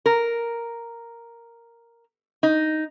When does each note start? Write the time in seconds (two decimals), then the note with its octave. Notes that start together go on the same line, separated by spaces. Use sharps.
0.06 A#4
2.43 D#4